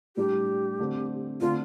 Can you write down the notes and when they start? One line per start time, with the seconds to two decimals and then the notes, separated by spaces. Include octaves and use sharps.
0.17 A2 G3 D4 G4
0.79 D3 A3 C4
1.41 D3 A3 C4 F4